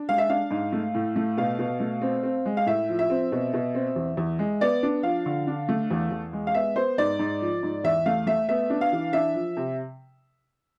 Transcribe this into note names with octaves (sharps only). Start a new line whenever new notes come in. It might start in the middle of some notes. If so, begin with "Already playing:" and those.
Already playing: D4
G#3 F5
E5
D4 F5
G#2
A3
A2
A3
B2 F5
B2
A3
C4
C4
G#3
F5
A2 E5
F3
E5
C4
B2
B2
C4
E2
E2
G#3
B3 D5
D4
F3 F5
D3
D4
A3
E2
E2
G#3
F5
B3 E5
B3 C5
G#2 D5
G#2
F3
G#2
E2 E5
A3 F5
A3 E5
B3 E5
D4
F5
E3
D4 E5
F3
C3